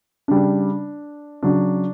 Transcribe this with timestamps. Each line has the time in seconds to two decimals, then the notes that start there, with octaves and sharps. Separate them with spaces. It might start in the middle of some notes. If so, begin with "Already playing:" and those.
0.28 C#3 G3 D4
1.43 C#3 F#3 D4